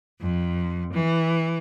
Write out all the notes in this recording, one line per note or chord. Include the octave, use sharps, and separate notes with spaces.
F2
E3